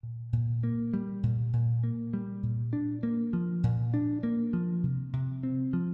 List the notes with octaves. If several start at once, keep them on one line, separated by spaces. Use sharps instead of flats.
A#2
A#2
A#3
G3
A#2
A#2
A#3
G3
A#2
D4
A#3
F3
A#2
D4
A#3
F3
C3
C3
C4
F3